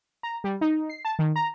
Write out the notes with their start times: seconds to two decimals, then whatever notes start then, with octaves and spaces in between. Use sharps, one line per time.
0.23 A#5
0.44 G3
0.61 D#4
0.89 C7
1.05 A5
1.19 D#3
1.36 A#5